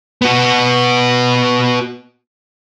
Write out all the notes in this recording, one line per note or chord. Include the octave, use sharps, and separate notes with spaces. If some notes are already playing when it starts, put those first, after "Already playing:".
B3 F#4